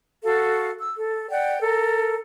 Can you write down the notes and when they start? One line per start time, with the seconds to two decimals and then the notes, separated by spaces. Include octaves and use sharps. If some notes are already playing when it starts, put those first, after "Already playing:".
0.24 F#4 A4 F5
0.79 E6
0.96 A4
1.30 D5 F#5 G5
1.62 A4 A#4